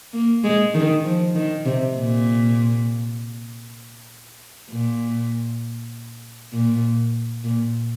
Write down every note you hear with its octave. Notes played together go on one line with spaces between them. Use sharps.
A#3
G#3
D#3
F3
D#3
C3
A#2
A#2
A#2
A#2